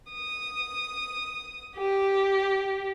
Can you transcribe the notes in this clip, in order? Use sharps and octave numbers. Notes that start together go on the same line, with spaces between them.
D#6
G4